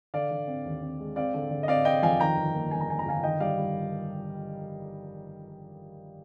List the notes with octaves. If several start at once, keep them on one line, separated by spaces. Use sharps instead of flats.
D3 D5 F5
D3
C4
D#2
C4
G#3
C4 D5 F5
D3
D3
D#5
C4 D5 F5
C4 D#5 G5
F2 F5 G#5
D#3 G5 A#5
G1
A#3
G1 G#5
A#5
A#3 G#5
A#5
G1 F5 G#5
D#3 D#5 G5
G3 D5 F5
G3